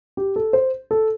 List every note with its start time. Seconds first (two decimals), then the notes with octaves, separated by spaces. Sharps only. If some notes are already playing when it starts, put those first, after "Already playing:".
0.17 G4
0.36 A4
0.53 C5
0.91 A4